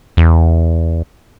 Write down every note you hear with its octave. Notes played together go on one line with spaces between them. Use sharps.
E2